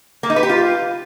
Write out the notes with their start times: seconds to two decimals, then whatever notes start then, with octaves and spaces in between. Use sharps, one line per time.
0.23 A#3
0.30 D#4
0.36 B4
0.43 G4
0.49 F4